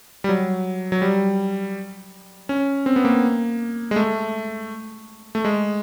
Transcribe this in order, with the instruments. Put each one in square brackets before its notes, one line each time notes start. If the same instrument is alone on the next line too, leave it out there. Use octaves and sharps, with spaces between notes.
[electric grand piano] G3
F#3
F#3
G3
C#4
C4
B3
A#3
G#3
A3
A3
G#3